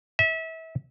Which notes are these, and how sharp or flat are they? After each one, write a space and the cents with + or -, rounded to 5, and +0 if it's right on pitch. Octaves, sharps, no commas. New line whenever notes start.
E5 -30